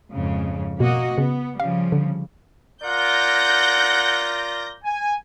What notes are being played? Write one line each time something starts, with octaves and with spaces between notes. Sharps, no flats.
F2 G#2 C#3
B2 A#3 F#4 D#5
C#3 B3
C#3 F3 G3 F5
D3
F4 A#4 D5 F#5 G6 A#6
G#5